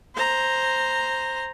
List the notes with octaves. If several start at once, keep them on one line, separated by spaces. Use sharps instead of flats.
C5 A#5